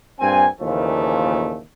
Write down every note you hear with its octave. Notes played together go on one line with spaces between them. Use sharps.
G2 A#2 C4 G#5
D#2 A#2 C#3 E3 F3 A3